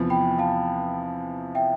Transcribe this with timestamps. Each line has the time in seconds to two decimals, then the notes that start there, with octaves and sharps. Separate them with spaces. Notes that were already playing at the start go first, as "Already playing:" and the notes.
Already playing: E2 C3 F3 B3
0.10 G5 B5
0.39 F5 A5
1.55 E5 G5